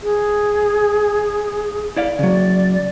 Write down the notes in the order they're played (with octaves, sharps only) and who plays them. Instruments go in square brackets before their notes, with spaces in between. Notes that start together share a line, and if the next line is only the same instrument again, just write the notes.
[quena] G#4
[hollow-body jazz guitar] E4 D5 F5
[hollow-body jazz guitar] C#3 F#3 [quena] D5